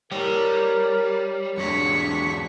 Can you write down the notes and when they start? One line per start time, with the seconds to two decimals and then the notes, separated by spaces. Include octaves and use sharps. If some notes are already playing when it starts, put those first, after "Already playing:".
0.12 G3 A#4 C#5 G5
1.57 E2 F#3 G#3 D4 C#6 B6